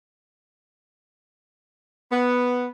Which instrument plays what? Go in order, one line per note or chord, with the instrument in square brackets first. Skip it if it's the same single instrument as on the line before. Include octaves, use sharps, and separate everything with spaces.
[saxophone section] B3